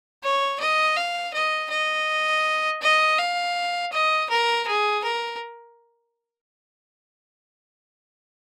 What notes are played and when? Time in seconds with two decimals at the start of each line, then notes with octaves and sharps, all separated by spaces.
0.23 C#5
0.60 D#5
0.97 F5
1.34 D#5
1.70 D#5
2.82 D#5
3.18 F5
3.92 D#5
4.29 A#4
4.67 G#4
5.04 A#4